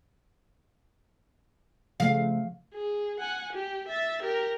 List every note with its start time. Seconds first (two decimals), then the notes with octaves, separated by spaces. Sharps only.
2.00 C#3 F3 A3 F5
2.74 G#4
3.20 F#5 G#5
3.53 G4
3.88 E5 A6
4.23 G4 A#4